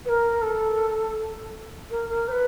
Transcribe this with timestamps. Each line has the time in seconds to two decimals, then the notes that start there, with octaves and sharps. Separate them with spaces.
0.05 B4
0.09 A#4
0.42 A4
1.91 A#4
2.09 A#4
2.28 C5
2.31 B4